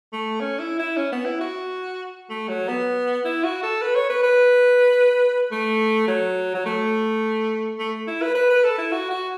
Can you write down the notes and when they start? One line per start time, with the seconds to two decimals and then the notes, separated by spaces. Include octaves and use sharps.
0.13 A3
0.41 C#4
0.59 E4
0.79 E4
0.97 C#4
1.12 B3
1.26 E4
1.41 F#4
2.30 A3
2.48 F#3
2.68 B3
3.25 E4
3.44 F#4
3.63 A4
3.82 B4
3.96 C#5
4.10 B4
4.23 B4
5.52 A3
6.08 F#3
6.55 F#3
6.66 A3
7.79 A3
8.08 E4
8.22 B4
8.35 B4
8.50 B4
8.64 A4
8.78 E4
8.92 F#4
9.11 F#4